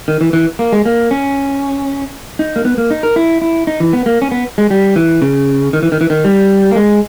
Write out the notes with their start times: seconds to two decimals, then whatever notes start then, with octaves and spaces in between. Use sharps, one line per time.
0.08 D#3
0.21 E3
0.33 E3
0.59 A#3
0.72 G#3
0.86 A#3
1.11 C#4
2.39 D#4
2.56 A#3
2.65 B3
2.78 A#3
2.90 D#4
3.03 A#4
3.16 E4
3.42 E4
3.67 D#4
3.80 E3
3.93 B3
4.06 A#3
4.22 C#4
4.31 B3
4.58 G#3
4.71 G3
4.96 E3
5.22 C#3
5.73 D#3
5.83 E3
5.92 D#3
6.01 E3
6.10 D#3
6.25 G3
6.71 A#3
6.76 G#3